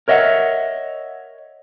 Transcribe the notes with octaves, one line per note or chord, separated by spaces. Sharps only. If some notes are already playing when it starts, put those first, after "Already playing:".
A#4 C#5 D#5 E5 F#5